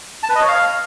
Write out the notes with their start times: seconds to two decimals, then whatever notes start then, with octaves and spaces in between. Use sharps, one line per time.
0.23 A5
0.29 B4
0.36 D#5
0.42 C#5
0.48 F5